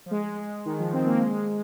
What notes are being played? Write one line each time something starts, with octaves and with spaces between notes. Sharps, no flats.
F3
G#3
G#3
D#3
F3
C4
A#3
G#3